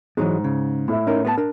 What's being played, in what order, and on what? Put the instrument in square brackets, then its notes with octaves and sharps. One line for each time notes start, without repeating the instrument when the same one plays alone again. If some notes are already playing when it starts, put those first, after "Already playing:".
[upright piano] G#2 [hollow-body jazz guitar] E3 F#3 G#3
[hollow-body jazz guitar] C#3
[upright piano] A2 E4
[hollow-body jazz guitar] C#4 D#4 A#4
B3 B4 A5
D4 A#4